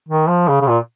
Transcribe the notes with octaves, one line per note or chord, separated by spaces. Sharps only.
D#3
F3
C#3
C#3
A#2